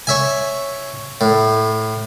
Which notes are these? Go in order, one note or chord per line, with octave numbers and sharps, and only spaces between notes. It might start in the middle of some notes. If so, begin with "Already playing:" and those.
C#5 E5 G#5
A2